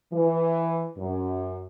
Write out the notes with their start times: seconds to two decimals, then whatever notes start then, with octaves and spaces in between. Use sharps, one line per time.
0.13 E3
0.97 F#2